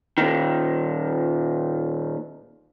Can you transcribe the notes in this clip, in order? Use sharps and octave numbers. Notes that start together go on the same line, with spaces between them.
A#2 D#3